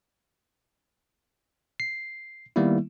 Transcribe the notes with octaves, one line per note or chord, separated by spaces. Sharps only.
C7
D#3 G3 A#3 B3 E4